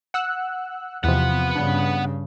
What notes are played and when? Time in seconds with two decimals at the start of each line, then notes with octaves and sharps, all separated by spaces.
0.14 F#5 E6 F#6
1.04 E2 C3 F3 B3 F#5
1.55 G2 C#3 D4